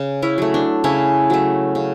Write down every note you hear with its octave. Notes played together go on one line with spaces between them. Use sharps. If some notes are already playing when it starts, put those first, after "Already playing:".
Already playing: C#3
C#4 E4
F#3 A3
D4
C#3 C#4 E4
F#3 A3
C#3